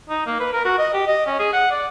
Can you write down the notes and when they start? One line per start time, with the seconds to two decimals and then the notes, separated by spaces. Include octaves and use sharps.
0.09 D#4
0.26 A#3
0.40 B4
0.53 A#4
0.65 F#4
0.78 D#5
0.93 G4
1.07 D#5
1.27 C#4
1.39 G#4
1.53 F#5
1.71 D5